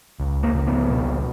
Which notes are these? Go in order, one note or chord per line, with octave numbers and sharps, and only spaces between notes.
C#2
A#3
C#2
B3
B2